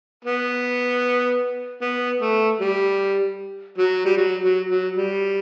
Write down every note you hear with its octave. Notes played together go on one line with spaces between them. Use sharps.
B3
B3
A3
G3
F#3
G3
F#3
F#3
F#3
G3